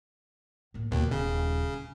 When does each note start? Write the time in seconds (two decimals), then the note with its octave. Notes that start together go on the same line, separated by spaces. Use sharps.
0.74 A2 A#3
0.91 D#2 B2 D#3
1.11 D#1 C#3